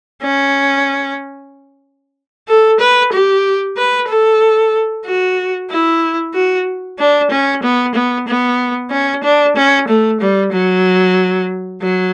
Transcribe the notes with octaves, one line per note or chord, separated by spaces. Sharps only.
C#4
A4
B4
G4
B4
A4
F#4
E4
F#4
D4
C#4
B3
B3
B3
C#4
D4
C#4
A3
G3
F#3
F#3